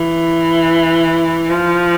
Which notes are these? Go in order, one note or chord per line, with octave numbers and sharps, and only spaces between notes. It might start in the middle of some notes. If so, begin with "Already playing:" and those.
Already playing: E3
F3